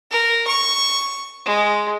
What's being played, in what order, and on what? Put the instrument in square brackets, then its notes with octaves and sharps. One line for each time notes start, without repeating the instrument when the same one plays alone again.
[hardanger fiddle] A#4
C#6
G#3